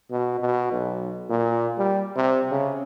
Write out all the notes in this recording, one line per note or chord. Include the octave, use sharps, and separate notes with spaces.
B2
B2
B1
A#2
G3
C3
C#3